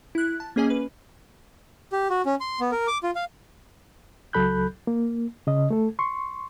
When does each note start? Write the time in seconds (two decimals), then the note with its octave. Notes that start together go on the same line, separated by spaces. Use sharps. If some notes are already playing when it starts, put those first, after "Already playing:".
0.15 E4 F#6
0.40 A5
0.56 A#3 C#4 G#4 D#5 G#5
0.70 B4
1.92 G4
2.10 F#4
2.25 C#4
2.41 C6
2.60 B3
2.72 A#4
2.87 D6
3.03 F4
3.15 F5
4.33 C#2 F#3 A4 B5 F#6 G6
4.87 A#3
5.47 C#3 D#5
5.71 A3 A4
5.99 C6 C#6